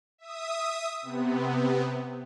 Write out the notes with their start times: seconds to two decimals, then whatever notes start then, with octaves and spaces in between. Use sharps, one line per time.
0.18 E5 D#6
1.02 C3 B3